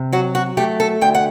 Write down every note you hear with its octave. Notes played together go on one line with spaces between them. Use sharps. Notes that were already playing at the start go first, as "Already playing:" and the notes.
Already playing: C3
F#3 F#4
F#4
A3 G4
A4
D2 G5
F#5